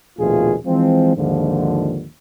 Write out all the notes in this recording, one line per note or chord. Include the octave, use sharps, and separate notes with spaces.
A#1 D#2 B2 A3 F4 G#4
E3 F3 G#3 C4
D#2 G#2 D3 D#3 F3